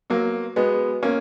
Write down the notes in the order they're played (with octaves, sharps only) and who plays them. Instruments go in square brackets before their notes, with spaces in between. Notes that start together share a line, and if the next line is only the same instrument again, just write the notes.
[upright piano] F#3 A#3 [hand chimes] B3
[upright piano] G#3 B3 [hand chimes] F#4 B4
[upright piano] A#3 C#4 [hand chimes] B3